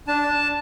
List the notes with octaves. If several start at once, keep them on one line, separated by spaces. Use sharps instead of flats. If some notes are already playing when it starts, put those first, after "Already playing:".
D4 A5